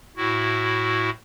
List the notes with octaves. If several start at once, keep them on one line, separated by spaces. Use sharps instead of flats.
A2 E4 F#4